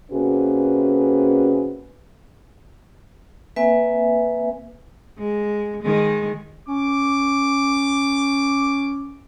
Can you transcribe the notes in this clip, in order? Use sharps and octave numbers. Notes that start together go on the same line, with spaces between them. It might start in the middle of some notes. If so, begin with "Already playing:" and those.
C3 A#3 C#4 F#4 G#4 B4
A#3 C4 B4 E5 G#5
G#3
D#3 G#3
C#4 D6